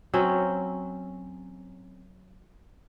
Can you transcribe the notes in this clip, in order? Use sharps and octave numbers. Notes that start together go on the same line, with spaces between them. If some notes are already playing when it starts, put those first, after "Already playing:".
F#3 C4 C#4 E5